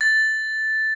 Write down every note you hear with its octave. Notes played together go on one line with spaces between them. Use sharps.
A6